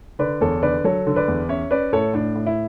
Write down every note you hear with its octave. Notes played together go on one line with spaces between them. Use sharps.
D3 B4 D5
E2 A4 C#5
D3 B4 D5
F#3 A4 C#5
D3
B4 D5
E2
C#4 C#5 E5
C#4 B4 D5
A2 A4 C#5
A2 D4
A2
E4